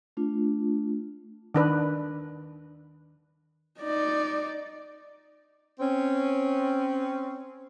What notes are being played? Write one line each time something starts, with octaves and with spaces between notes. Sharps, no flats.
A3 D4 F4
D#3 D4 B4
D#4 D5
C4 C#4